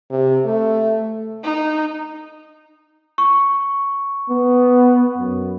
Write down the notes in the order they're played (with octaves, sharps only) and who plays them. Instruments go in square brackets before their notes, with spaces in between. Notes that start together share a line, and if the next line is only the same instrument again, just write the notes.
[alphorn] C3
A3
[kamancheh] D#4
[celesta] C#6
[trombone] B3
F#2